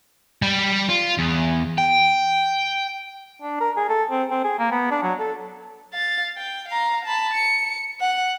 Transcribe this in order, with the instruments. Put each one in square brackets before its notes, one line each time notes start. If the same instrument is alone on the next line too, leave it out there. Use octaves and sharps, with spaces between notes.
[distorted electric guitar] G3
F4
E2
G5
[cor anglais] D4
A#4
G#4
A4
C4
C4
G#4
A#3
B3
D4
F#3
A4
[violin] F5 A6
G5
F5 A#5
A5 B5
C#7
F#5